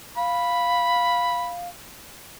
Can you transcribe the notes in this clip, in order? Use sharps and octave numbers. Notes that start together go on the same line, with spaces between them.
F5 B5